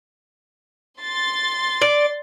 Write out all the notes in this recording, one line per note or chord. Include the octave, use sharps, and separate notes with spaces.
C6 A6
D5